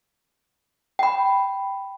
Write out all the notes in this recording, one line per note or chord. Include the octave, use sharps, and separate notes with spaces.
G5 B5